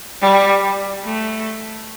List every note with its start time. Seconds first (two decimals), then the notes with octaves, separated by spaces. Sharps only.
0.22 G3
1.05 A3